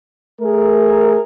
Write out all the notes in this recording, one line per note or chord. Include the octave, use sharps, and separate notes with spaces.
A3 G#4 A#4